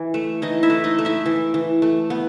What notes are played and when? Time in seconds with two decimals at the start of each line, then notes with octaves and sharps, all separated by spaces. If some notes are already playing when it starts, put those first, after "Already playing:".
Already playing: E3
0.14 A3
0.42 E3 D#4 D#5
0.63 E4 E5
0.70 A3
0.84 D#4 D#5
0.99 A3
1.05 E4 E5
1.26 E3
1.54 E3
1.82 A3
2.10 B3